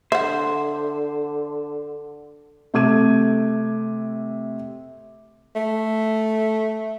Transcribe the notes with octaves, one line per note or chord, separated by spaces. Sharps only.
D3 C5 E5 F#5
C3 A3 D6 G#6 D#7
A3